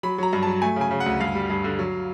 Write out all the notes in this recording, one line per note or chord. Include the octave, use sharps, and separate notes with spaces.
F#3 B5
F#3 A#5
G2
F#3 A5
A3 G#5
C#3 G#5
C#3
F#5
D2
G2 F5
G3
G2
D3
F#3